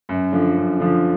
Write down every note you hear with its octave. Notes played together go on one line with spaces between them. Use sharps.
F#2
D3 F3
F#2
D3 F3